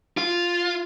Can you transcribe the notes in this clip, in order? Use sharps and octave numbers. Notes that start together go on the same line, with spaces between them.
F4